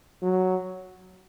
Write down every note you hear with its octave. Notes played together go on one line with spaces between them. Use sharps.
F#3